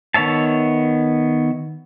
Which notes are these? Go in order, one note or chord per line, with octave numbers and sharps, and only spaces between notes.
D#3 B3 C#5 E5 A5